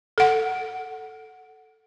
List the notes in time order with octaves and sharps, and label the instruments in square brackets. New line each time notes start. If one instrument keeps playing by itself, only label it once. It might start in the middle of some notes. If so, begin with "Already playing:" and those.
[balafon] A4 F#5